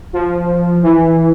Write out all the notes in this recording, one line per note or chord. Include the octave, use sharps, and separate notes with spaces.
F3
E3